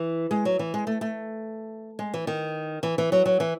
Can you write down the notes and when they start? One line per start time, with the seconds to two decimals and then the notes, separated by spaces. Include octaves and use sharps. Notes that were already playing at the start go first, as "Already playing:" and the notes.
Already playing: E3
0.31 G#3
0.45 F#3
0.59 E3
0.74 G#3
0.87 A3
1.01 A3
1.99 G#3
2.14 E3
2.27 D#3
2.83 E3
2.98 E3
3.12 F#3
3.25 F#3
3.40 E3